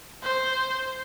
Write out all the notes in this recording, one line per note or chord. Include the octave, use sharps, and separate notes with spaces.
C5